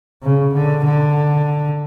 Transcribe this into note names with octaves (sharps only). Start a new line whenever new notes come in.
C#3
D3
D3